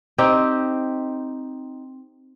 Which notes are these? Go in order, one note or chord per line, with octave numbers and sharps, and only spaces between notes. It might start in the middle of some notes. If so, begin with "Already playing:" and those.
C4 D#4 G4